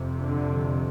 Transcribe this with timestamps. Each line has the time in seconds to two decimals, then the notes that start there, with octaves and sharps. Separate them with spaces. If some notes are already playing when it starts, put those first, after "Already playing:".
Already playing: F2 C3
0.23 D3